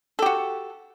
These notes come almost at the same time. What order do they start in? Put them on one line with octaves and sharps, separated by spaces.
A4 G4 F#4